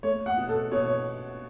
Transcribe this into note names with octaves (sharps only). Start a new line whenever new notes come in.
A3 C#5
F#5
B2
A4
B2 C#5
C#5